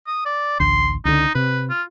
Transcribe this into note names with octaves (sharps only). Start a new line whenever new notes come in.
D#6
D5
A1 D2 C6
C#2 D3 D#4
C3 B4
F4